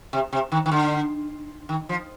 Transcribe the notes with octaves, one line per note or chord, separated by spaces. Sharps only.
C3
C3
D#3
D#3
D3
D#3
F3